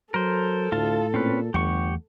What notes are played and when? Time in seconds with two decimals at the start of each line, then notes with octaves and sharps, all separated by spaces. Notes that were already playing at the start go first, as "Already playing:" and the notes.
0.14 F#3 A4 A#4 C5
0.72 D2 A2 F4 A5
1.14 A#2 C4 C#4 B4
1.54 G1 E2 A3 G4 F#5 C#6